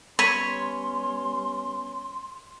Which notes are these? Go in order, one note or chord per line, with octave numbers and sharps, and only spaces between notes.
G3 B3 C#4 C#5 B5 C6 B6 D#7